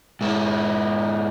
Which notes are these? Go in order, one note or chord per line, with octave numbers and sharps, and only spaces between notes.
G#2 E4